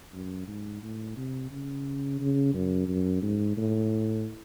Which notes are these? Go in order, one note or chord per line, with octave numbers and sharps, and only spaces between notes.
F#2
G#2
A2
C3
C#3
C#3
F#2
F#2
G#2
A2